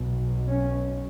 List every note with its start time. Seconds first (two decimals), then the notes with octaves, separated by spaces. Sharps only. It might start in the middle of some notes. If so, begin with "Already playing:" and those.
Already playing: B1 B2
0.49 C#4